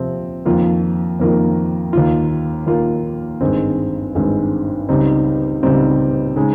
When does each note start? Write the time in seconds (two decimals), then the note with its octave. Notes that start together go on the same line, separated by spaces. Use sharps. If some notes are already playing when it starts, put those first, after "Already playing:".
Already playing: C3 F3 C4
0.45 F2 D#3 A#3 F4
1.19 F2 D#3 A#3 F4
1.93 D#2 D#3 A#3 F4
2.67 D#2 D#3 A#3 F4
3.41 G#1 G2 D#3 G#3 C4
4.15 G#1 G2 D#3 G#3 C4
4.89 C#2 C#3 G3 C4 D#4
5.63 C#2 C#3 G3 C4 D#4
6.36 C#3 G#3 D#4